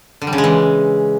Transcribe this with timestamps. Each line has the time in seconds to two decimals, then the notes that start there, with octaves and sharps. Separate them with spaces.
0.22 D3
0.27 G3
0.33 C#3
0.38 G#3
0.44 E3